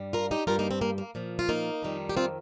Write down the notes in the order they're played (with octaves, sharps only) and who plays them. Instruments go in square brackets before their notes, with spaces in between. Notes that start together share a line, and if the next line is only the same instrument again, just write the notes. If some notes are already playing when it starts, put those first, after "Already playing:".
Already playing: [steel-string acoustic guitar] G2 G3
F4 A#4
D#4 G4
G2 G3 F4 A#4
A#3 D#4
C4
A#3
A#3
A#2 F3
F4
A#3 D#4
F2 D#3 G3
G4
C4 F4